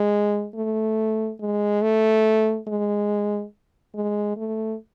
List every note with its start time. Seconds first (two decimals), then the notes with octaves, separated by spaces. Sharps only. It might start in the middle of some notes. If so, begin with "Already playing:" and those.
Already playing: G#3
0.55 A3
1.41 G#3
1.82 A3
2.68 G#3
3.95 G#3
4.37 A3